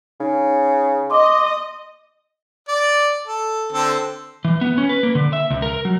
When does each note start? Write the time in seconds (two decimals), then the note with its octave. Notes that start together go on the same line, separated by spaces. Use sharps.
0.20 C#3 D#4
1.10 D#5 C6 D6
2.68 D5
3.27 A4
3.72 D3 C4 A4
4.45 E3
4.61 B3
4.78 C#4
4.89 B4
5.03 A#3
5.15 D3
5.33 E5
5.50 C#2
5.62 A#4
5.85 F#3